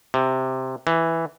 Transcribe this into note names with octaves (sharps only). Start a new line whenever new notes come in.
C3
E3